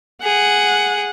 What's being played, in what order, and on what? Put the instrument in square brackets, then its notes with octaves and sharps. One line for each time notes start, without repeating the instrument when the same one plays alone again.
[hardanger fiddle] G#4 [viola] F#5